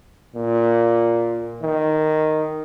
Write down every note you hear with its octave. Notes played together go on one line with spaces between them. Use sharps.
A#2
D#3